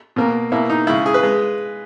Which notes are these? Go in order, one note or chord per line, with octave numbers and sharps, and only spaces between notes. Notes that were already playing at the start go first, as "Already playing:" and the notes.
B2 A#3
B2 A#3 E4
D#4
C#3 G#3 E4
G#4
B4
G#3